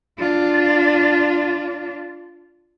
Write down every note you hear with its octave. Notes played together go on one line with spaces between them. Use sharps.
D4 F4